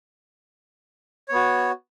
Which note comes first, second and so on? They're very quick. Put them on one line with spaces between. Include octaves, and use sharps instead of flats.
C#5 B3 F#4